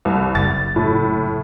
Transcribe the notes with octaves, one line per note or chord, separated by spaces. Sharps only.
C2
F#1 A6
A2